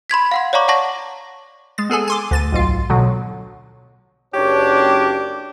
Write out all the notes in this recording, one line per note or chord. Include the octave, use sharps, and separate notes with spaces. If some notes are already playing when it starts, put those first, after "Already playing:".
B5 C6 G#6 B6
F5 F#5 C6
C#5 D5 F5 A#5 C#6 D6
F#5 A5 C#6 A#6
G#3 A6
B3 G#4 A4 G#5
G#5 C6 D6
D2 A6 D#7
B1 G#2 F4
B2 D3 F#3
F#1 D4 G4 C#5